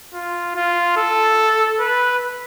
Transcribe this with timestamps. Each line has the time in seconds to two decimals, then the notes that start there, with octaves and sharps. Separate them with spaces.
0.14 F4
0.55 F4
0.97 A4
1.79 B4